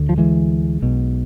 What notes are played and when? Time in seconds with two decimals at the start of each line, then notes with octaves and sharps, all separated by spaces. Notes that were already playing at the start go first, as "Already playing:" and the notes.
Already playing: D2 D3
0.09 F3
0.18 E3 G#3
0.82 B1 B2